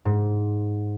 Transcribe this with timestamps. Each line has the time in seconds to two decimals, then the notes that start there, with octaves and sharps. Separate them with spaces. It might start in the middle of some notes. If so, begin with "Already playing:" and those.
0.05 G#2